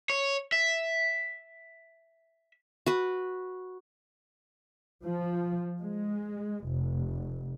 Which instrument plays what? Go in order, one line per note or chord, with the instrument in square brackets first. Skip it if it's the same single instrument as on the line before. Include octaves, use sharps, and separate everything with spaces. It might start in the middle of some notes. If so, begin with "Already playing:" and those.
[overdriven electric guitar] C#5
E5
[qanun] F#4 B4
[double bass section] F3
G#3
F1